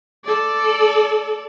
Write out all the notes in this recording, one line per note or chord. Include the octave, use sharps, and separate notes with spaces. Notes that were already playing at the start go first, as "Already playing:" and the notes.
A4 D5